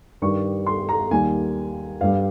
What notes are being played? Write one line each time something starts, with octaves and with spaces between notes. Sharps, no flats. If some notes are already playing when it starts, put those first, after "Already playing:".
G2 D#3 G3 C#6
C6
A#5
D#2 D#3 G3 G#5
G2 G3 F5